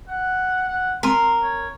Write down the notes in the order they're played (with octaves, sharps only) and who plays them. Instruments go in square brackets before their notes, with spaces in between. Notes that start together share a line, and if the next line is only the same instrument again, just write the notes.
[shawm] F#5
F#5
[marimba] G#3 C4 [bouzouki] A#4 [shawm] C6
[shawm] C#5